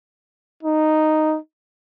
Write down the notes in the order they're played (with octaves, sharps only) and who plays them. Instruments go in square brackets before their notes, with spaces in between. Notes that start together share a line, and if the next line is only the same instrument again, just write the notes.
[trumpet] D#4